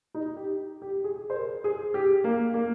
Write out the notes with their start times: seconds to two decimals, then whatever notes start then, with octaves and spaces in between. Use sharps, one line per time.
0.14 D#4
0.36 G4
0.82 G4
1.04 G#4
1.30 C5
1.35 A#4
1.64 G#4
1.94 G4
2.24 A#3
2.54 A#3